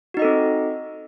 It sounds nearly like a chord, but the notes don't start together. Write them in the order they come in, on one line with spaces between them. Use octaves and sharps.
F#4 D#4 D#5 A4 C4